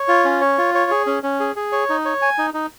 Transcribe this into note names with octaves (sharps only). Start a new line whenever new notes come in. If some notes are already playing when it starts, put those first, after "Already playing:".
Already playing: C#5
F4
C#4
C#5
F4
C#5
G#4
C#4
C#4
G#4
G#4
C#5
D#4
C#5
G#5
D#4
D#4